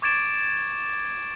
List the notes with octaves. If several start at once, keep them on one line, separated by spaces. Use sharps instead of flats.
C#6 D6 G#6 A6 D7 E7